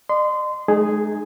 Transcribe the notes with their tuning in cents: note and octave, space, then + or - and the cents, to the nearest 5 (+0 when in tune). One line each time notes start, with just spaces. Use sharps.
D#5 -45 C6 -25
G#3 +40 D#4 -30 G#4 +0